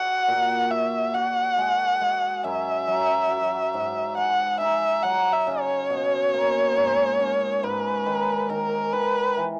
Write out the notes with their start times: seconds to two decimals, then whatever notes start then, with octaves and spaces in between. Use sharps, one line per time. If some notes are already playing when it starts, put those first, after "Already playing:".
Already playing: F#4 F#5
0.28 A#2
0.71 F#4 E5
1.14 F#4 F#5
1.58 G#3
2.01 G#3
2.44 F#2 E5
2.87 F#3
3.30 F#3
3.74 G#2
4.17 G#3 F#5
4.60 D#4 E5
5.03 F#3 F#5
5.33 E5
5.47 C#3
5.61 C#5
5.90 B2
6.34 A#3
6.77 G#2
7.20 C#4
7.63 G#2 B4
8.06 D#3
8.49 D#3 A#4
8.93 D#3 B4
9.37 E3